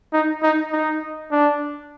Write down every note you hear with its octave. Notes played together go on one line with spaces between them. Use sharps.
D#4
D#4
D#4
D4